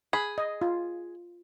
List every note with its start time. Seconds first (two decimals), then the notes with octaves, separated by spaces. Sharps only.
0.13 G#4 B5
0.38 D#5
0.62 F4